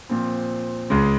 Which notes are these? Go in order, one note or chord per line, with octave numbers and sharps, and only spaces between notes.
A#2 F3 C4
C#2 C#3 G#3